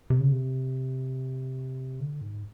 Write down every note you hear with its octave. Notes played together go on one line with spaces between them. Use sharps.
C3
C#3
C3
D3
G#2